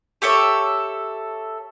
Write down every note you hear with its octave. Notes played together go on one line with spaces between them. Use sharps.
G4 A4 C#5 E5